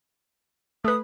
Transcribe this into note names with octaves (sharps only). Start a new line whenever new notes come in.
A3 B4 D#6